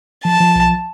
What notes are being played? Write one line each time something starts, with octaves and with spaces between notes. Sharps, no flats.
F3 A5
F3
B1